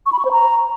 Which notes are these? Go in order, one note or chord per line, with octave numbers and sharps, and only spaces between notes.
C#6
B5
C#6
C5
A#5